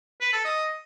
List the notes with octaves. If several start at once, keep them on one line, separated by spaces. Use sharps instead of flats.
B4
A4
D#5